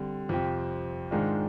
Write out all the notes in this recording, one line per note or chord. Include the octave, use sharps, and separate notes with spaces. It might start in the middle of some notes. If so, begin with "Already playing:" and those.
Already playing: D3 G3 C4
F2 C3 F3 C4 G4
G#2 D#3 G#3 D4 F4